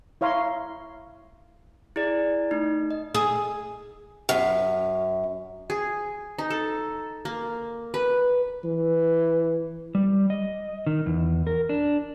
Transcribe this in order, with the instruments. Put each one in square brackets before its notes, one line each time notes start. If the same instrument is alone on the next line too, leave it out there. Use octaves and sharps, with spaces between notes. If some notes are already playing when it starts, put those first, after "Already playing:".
[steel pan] E4 C#5 F5 A#5 C6
[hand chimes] E4 G#4 D5
A3 D#4
D#5
[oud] G#4
[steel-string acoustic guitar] F#2
[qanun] G#4
D#4
A4
A#3
B4
[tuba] E3
[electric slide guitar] G3
D#5
D#3
E2
A#4
D4